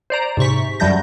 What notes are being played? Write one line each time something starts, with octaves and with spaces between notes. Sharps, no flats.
C5 D5 A#5
G#2 C3 C#6 B6
F#2 F#3 G3 A3 G6 A#6